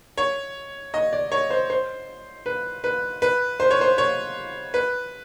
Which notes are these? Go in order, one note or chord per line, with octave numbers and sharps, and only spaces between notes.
C#5
D#5
D5
C#5
C5
C5
B4
B4
B4
C5
C#5
C5
C#5
B4